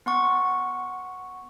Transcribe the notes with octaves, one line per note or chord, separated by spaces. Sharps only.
B3 F#5 C#6